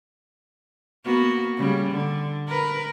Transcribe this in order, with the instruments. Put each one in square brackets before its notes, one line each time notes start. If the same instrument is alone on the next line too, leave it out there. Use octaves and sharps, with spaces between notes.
[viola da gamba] A#3 B3 F#4
C#3 G3
D3
A#4 B4